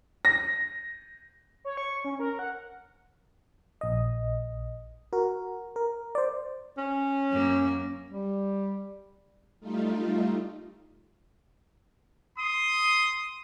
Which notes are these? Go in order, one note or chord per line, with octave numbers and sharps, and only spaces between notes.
A#6
C#5
C#6
C#4
A#4
F#5
A#1 D#5
F#4 A#4
A#4
C5 D5
C#4
F#2 A#3
G3
G3 A3 D#4 F4
C6 D#6